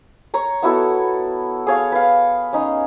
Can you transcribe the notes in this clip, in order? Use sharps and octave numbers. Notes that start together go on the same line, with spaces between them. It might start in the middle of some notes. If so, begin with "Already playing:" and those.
C#5 A#5 C#6
B3 E4 F#4 A4
G#4 C#5 F5
B4 F5
C#4 D#4